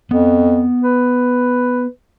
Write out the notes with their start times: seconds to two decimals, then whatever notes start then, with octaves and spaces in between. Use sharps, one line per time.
0.11 F2 B3
0.83 B4